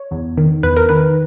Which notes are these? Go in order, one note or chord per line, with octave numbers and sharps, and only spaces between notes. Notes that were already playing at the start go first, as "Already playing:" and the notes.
Already playing: C#5
E2
D#3
E2 B4
A#4
D#3 B4